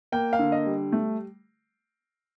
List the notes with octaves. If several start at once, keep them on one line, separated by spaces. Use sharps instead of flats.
A#3 G5
F5
D3
D#5
G3
A3